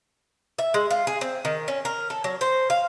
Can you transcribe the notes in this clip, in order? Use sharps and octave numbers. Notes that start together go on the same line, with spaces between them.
E5
G#3
F4
G#4
C4
D#3
C#4
A#4
A4
F#3
C5
F5